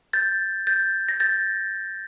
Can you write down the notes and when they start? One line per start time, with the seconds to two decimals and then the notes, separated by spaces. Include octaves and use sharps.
0.13 G6 A6
0.67 G6 A6
1.09 A#6
1.20 G6 A6